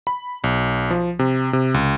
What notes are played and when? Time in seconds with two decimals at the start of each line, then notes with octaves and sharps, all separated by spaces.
0.07 B5
0.44 B1
0.90 F3
1.19 C3
1.53 C3
1.74 C#2